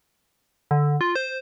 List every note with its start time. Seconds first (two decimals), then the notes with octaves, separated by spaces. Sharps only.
0.71 D3
1.01 F4
1.16 C5